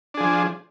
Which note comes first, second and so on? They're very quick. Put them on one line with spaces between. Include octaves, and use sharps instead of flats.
D4 G#4 F3